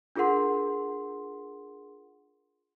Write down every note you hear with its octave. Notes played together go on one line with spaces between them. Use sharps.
D4 F4 G#4 A#4 F#5 C6